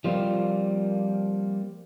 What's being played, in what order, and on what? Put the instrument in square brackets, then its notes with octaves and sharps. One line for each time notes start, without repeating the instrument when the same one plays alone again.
[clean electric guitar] F3 G3 A#3 C4 F4